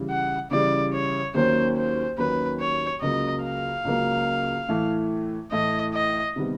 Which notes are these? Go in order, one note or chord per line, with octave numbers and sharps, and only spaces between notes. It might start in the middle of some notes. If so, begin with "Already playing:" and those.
Already playing: C#3 E3 G3
F#5
C#3 E3 G3 D5
C#5
D#2 D#3 F#3 A#3 C#4 C5
C5
D#2 D#3 F#3 A#3 C#4 B4
C#5
C#2 C#3 F#3 A#3 D#5
F5
C#2 C#3 F#3 A#3
A2 E3 A3
A2 E3 A3 D#5
D#5
C3 D#3 G3 B3